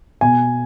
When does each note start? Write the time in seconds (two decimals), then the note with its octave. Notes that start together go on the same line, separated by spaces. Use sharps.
0.21 B2 G#5